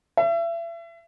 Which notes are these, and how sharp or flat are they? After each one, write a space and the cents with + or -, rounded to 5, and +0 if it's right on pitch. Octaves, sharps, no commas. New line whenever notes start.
E5 +35